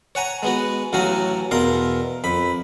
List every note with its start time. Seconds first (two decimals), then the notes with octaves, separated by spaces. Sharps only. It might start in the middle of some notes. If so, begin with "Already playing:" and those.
0.15 C#5 F#5 G#5 A#5
0.43 G#3 B3 F#4
0.93 A1 A2 F#3 F#4 F5 G#5
1.51 E2 B2 A#4 F5 C6
2.24 F2 B5